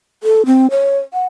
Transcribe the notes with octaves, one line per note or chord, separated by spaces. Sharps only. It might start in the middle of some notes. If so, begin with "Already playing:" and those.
A4
C4
C#5
F#5